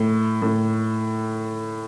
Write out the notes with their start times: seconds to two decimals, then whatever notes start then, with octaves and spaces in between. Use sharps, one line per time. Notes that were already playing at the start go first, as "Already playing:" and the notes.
Already playing: A2
0.42 A2